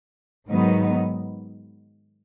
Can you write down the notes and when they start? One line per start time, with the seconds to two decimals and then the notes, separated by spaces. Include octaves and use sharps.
0.48 G#2 D#3 F#3 B3 D#4